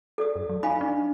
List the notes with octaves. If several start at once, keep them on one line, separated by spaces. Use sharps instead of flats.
A4 D5 D#6
F#2
F#3
D#4 F5 G#5 B5
D4